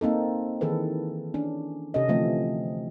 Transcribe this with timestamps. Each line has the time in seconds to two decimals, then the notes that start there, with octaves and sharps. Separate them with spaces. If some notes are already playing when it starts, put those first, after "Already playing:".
0.01 A#3 C4 D#4 A4
0.61 D#3 E3 G#4 A4 B4
1.34 C#4 D4
1.94 C3 C#4 A4 D#5
2.09 D3 E3 F3 A3 C4